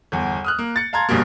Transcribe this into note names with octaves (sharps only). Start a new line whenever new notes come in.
G1 E2
D#6 F6 F#6
A#3
A6 C#7
F5 A5 A#5 C6 G#6
A#1 G2 B2 G3 A#3